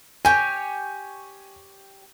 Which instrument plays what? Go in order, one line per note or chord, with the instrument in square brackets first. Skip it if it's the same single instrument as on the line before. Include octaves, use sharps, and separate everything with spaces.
[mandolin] G4 C#5 [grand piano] G#5